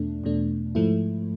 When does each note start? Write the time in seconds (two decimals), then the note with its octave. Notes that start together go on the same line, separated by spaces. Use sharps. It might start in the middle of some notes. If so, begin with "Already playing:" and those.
Already playing: E2 B2 A3 D4
0.24 E2 B2 A3 D4
0.75 G#2 F3 A3 E4